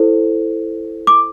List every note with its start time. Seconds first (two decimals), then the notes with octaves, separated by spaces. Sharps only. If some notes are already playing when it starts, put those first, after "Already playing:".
Already playing: E4 A4 C5
1.07 D6